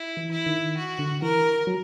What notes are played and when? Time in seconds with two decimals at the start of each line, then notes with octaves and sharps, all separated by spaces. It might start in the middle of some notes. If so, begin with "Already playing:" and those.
Already playing: E4
0.17 E3
0.31 E4
0.46 D#3
0.77 F#4
0.99 D3
1.22 E3 A#4
1.67 F#3